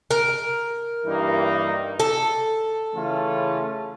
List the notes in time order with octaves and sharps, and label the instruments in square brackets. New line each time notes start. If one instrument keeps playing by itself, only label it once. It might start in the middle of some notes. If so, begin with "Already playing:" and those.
[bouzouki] A#4
[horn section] G2 E3 G3 A#3 D#4
[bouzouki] A4
[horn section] C#3 E3 A3 C#4 F4